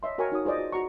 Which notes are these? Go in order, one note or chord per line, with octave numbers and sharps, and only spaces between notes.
C#5 D#5 E5 C6
F#4 A#4 C#5 G5 G#5 C#6
D#4 F#4 C#5 D#6
F4 G#4 C5 D5 D#5
F#4 G#4
F#4 A#5 C#6